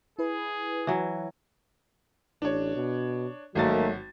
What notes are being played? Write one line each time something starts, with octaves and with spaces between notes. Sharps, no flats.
E4 G#4 B4
E3 F#3
A1 D4 C#5
B2
G#1 D#3 F#3 A3 A#3 F#4 A6